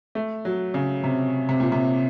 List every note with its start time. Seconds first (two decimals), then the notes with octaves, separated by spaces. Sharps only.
0.15 A3
0.45 F#3
0.74 C#3
1.04 C3
1.49 C3
1.60 A#2
1.72 C3